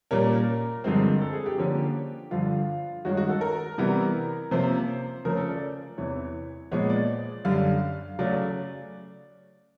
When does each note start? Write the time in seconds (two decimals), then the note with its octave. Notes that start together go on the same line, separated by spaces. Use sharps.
0.11 A#2 G3 A#3 C#4 A#4
0.84 G2 D3 F3 G#3 C4
1.21 A4
1.33 G#4
1.46 G4
1.58 D3 F3 A#3 C#4
2.31 G2 D3 F3 F4
3.05 G2 D#3 G#3 C#4 F#4
3.17 F#4
3.29 A4
3.41 A#4
3.78 C3 E3 G3 B3
4.51 C3 F3 A#3 C#4 C5
5.25 C#3 F3 A3 C#4 A#4
5.37 A4
5.49 D5
5.98 E2 C3 E3 C#5
6.71 A#2 F3 G#3 B3 C#5
6.90 D5
7.45 F#2 D3 G3 F5
8.19 C#3 F#3 A3 D5